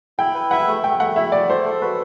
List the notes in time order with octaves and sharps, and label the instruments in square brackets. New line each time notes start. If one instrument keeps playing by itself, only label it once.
[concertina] E4 [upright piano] G5
[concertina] B4
[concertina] E5 [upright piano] F#5
[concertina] A3
[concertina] A3 [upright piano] G5
[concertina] A3 [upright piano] F#5
[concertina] E4 [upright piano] E5
[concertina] A3 [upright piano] D5
[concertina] A4 [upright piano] C5
[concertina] A4
[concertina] F#4 [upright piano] B4